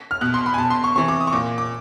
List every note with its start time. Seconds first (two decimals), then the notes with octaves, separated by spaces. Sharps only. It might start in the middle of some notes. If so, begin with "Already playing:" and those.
0.11 F6
0.21 B2 F#6
0.34 C6
0.46 B5
0.54 G#5
0.58 B2 A5
0.70 C6
0.84 C#6
0.96 C3 E3 C#6
1.08 D6
1.20 D#6
1.27 C#6
1.32 A#2 D6
1.58 D6